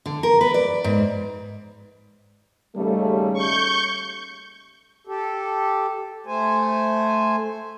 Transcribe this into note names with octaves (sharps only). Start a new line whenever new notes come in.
D3
A#4
B4
D5
G#2
D#2 C#3 G3 A3
C#6 G6
G4 A4
A3 C5 G#5